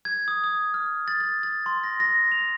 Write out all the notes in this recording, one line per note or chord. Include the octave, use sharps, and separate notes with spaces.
G#6
D#6
D#6
F6
A6
A6
A6
C6
A#6
A#6
F7